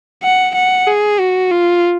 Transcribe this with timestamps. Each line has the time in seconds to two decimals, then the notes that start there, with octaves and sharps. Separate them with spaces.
0.24 F#5
0.55 F#5
0.88 G#4
1.20 F#4
1.51 F4